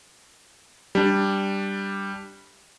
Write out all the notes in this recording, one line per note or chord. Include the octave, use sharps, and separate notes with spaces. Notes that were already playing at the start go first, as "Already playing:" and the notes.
G3 D4